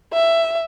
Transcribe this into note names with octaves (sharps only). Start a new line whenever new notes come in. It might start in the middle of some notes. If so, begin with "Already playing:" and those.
E5